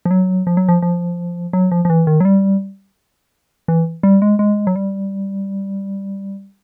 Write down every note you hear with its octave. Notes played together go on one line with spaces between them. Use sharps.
F3
F#3
F3
F#3
F3
F3
F#3
F3
F3
E3
D#3
F#3
G3
E3
G3
G#3
G#3
F#3
G3